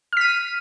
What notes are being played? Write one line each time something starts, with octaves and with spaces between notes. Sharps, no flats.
F6 B6 D#7